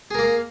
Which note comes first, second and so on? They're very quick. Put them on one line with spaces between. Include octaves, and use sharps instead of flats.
G#4 A#4 A#3